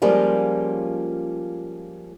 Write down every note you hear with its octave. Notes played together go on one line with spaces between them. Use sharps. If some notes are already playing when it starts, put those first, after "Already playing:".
F3 G3 G#3 A#3 C#4 F4